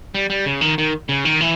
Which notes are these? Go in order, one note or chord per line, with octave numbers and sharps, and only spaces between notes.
G3
G3
C#3
D#3
D#3
C#3
D#3
E3